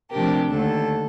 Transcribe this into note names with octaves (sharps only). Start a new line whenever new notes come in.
C3 F3 A3 D4 G4 A#4
D#2 D3 A3 A4